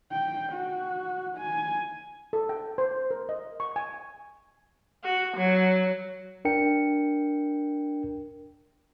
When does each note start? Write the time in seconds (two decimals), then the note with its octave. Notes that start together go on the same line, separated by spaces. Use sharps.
0.12 G5
0.53 F#4
1.38 G#5
2.33 A4
2.49 G5
2.78 C5
3.11 A#4
3.29 D#5
3.60 C#6
3.76 G#5
5.04 F#4
5.37 F#3
6.45 D4 A#4 G5 C#7